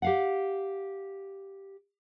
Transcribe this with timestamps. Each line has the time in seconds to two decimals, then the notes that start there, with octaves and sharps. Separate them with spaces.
0.02 G4 F5 F#5